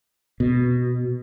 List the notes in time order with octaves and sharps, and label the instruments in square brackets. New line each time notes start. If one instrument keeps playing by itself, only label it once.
[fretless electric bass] B2